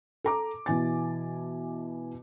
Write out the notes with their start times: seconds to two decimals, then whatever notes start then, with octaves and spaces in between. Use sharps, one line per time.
0.24 A4 A#5 D6
0.66 B2 E3 G#5 A6